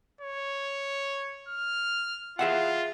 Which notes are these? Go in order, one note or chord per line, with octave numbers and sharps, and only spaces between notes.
C#5
F6
F4 G#4 E5 F#5